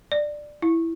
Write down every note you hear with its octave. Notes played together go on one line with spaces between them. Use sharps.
D5
E4